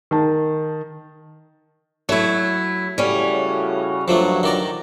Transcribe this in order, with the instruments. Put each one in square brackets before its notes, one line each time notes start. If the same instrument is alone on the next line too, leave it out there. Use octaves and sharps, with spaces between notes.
[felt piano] D#3 A5
[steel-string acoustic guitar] F#3 E4 [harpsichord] A3
[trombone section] A2 C#3 F#4 [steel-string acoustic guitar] G3 C#4
[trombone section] G2 F#3 [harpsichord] F3 A3 D4
[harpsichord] D#3 D5 A#5